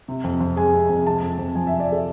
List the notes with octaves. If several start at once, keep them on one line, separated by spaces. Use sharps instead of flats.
C3
F2
F2
G#3 G#5
C3
F2
C3 A5
F2
F2
F3 G#5
C3 E5
D5
A4